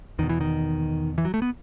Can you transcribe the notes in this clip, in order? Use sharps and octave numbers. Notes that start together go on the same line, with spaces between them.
E2 B2 D#3
E3
D#3
E3
F#3
A3
B3